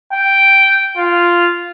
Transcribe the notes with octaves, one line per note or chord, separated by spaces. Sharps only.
G5
F4